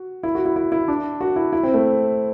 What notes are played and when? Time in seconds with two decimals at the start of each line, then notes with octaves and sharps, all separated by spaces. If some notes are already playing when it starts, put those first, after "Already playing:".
Already playing: F#4
0.23 E4
0.35 F#4
0.45 E4
0.56 E4
0.72 E4
0.88 D4
1.20 F#4
1.36 E4
1.53 E4
1.63 C4
1.74 A3